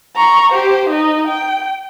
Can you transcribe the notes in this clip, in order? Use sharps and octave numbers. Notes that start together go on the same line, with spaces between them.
A#5 C#6
G4 C5
D#4 D#5
G5